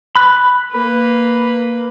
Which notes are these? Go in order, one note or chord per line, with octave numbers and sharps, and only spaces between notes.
B5 F#6
A#3 B4